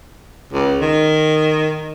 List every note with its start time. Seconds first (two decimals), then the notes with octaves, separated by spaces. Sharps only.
0.53 C#2
0.81 D#3